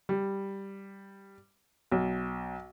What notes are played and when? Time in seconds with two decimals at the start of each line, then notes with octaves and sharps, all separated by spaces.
0.09 G3
1.92 B1